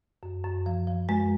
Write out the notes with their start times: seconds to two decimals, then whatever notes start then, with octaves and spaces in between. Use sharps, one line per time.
0.23 F#2
0.44 F#2
0.66 F3
0.87 F3
1.09 F#2 G#3